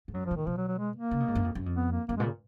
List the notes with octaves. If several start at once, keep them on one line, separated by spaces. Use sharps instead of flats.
G#2
F#2 F#3
F3
A#2
D#3
B2 F3
F#3
F#3
G#3
A#3
C#3
B2
G#2
F#2
F2
F#2
F2
B3
A#3
F#2 A#3
G#3
A#2
C#3